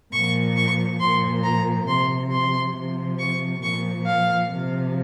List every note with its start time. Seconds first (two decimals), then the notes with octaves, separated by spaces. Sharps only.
0.11 A#2 F3 C#6
0.56 C#6
0.99 A#2 F3 C6
1.43 A#5
1.87 C3 F3 C6
2.31 C6
2.74 C3 F3
3.18 C#6
3.62 A#2 F3 C#6
4.05 F5
4.49 C3 F3